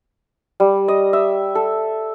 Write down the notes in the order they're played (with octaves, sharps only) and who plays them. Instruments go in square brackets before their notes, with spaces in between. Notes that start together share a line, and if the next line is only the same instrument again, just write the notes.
[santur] G3
D#5
E5
A4